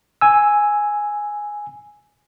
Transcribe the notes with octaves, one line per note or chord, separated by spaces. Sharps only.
G#5 E6